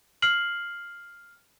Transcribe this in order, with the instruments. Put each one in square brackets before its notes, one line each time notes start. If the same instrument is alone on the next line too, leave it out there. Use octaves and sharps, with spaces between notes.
[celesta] F6 C7 F#7